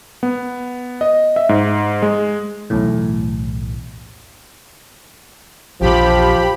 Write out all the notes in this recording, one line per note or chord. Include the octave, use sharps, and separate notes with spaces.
B3
D#5
E5
G#2
G#3
B1 E2 A2
A#1 E2 F3 G4 B5